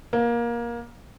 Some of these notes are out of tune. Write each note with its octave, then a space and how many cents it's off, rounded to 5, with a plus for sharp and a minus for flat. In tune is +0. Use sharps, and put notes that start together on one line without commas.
A#3 +20